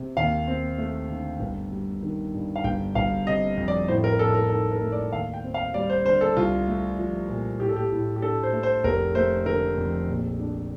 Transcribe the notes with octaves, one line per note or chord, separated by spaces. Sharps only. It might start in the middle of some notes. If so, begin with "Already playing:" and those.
Already playing: C3
D#2 F5
C4
A3
D3
G1
G3
D#3
G2
F5
G1 G5
G1 F5
C3 D#5
F2
D5
A2 C5
A#4
A2 A4
A#4
D#4 A4
A#4
A3
D5
D#2 F5
G5
C4
F5
G3 D5
C5
D3 C5
A4
C2 F4
A3
F3
A#2
A2 G4
A4
G4
A2
G4
D4 A4
C5
A3
C5
F1 A#4
A3 C5
D3 A#4
F2
A#1
D4